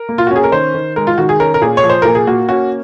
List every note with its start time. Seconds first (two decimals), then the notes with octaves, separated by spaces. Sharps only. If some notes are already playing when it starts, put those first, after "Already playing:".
Already playing: A#4
0.09 A#3
0.18 F4
0.27 F#4
0.31 C#4 G#4
0.44 A#4
0.52 D#3 C5
0.74 D#3
0.96 G#3 A#4
1.07 F4
1.18 D#3 F#4
1.29 G#4
1.40 C#4 A#4
1.54 A#4
1.62 A#2 G#4
1.77 C#5
1.84 F3
1.90 C5
2.02 A#2 A#4
2.15 G#4
2.27 A#3 F#4
2.49 C#4 F#4